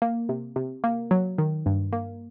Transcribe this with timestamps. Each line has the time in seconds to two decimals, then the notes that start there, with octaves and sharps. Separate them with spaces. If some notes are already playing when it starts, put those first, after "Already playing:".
0.02 A#3
0.29 C3
0.56 C3
0.84 A#3
1.11 F#3
1.38 D#3
1.66 G2
1.93 A#3